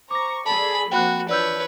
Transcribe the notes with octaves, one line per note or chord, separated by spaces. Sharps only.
C5 A#5 C#6 D6 A#6
G#4 A4 D5 A5 B5
F3 A#3 C4 F#4 G5 B5 F#6
E3 F3 D4 B4 C#5 D5 E6 G6